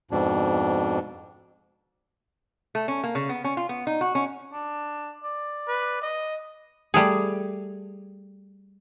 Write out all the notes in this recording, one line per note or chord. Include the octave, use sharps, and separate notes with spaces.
F2 G#2 B2 D4
A3
C#4
A#3
C#3
B3
C#4
F4
B3
D#4
F#4
C#4
D4
D5
B4
D#5
G3 A3 G#4